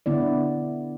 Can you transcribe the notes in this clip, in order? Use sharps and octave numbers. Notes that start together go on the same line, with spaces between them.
D3 B3 E4 D5